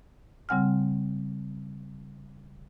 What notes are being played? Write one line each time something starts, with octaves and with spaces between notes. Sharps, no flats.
C#3 G3 C4 F#5 G#5 F6